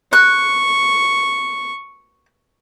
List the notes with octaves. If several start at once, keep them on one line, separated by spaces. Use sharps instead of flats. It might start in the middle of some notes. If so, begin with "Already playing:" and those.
C#6 F#6